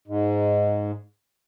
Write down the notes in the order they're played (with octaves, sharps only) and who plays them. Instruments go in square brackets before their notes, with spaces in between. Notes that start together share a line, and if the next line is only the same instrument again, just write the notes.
[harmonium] G#2